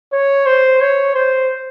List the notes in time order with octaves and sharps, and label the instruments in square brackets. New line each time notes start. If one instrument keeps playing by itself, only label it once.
[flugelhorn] C#5
C5
C#5
C5